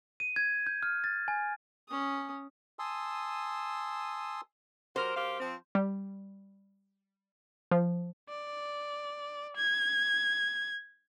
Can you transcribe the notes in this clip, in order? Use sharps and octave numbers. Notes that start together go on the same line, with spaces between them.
D#7
G#6
G6
F6
A6
G#5
C#4 D#6
G#5 A5 C6 D#6 E6
F#3 G4 A#4 C5
F#2 G4 F5
F3 C4
G3
F3
D5
G#6